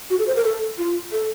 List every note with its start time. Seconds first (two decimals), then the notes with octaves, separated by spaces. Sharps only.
0.10 F#4
0.19 A4
0.27 C5
0.36 A#4
0.44 A4
0.78 F4
1.12 A4